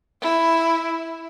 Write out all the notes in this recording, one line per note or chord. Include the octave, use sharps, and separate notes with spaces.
E4